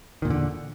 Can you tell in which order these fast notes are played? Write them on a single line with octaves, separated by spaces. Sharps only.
D#3 A#2 E2 D3